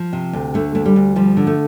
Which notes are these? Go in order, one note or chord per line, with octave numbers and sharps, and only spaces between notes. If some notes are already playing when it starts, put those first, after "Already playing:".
Already playing: F3
C3
D2
D3 A3
D2 A3
G3
D2
F3 G3
D3
A3